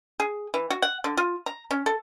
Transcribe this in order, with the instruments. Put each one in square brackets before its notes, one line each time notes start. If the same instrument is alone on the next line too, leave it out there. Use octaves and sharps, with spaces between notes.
[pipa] G#4
E3
F#4
F#5
D3
F4
A#5
C#4
A4